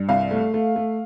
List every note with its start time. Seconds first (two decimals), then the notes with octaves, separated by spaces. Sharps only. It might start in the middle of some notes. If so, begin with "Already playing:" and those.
Already playing: G2
0.09 C2 F5
0.31 A3
0.54 A3
0.76 A3